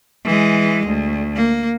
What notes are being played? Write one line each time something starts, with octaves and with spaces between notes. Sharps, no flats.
E3 G#3
D2
A#3